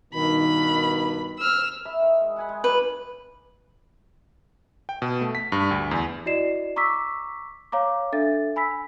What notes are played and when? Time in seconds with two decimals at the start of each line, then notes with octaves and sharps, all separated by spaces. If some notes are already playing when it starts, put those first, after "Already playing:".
0.14 G2 B2 D#3 B5
1.38 E6 F6
1.85 E5 B5
2.00 D#3
2.21 G#3
2.36 F#5 G#5 B5
2.49 G#3
2.64 F#3 G3 B4
4.89 G5
5.02 B2
5.21 A3
5.35 B6
5.52 G2
5.71 D2
5.91 E2
6.26 E4 F#4 D5 D#5 C7 E7
6.76 A#5 C#6 D6 E6 B6
7.72 C#5 F5 A#5 D6
8.13 D4 A4 E5 A6
8.56 G#5 B5 E6 B6